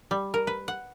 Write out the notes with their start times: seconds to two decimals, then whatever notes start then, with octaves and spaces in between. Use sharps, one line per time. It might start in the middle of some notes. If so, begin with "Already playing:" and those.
0.11 G3
0.34 A#4
0.47 B4
0.68 F#5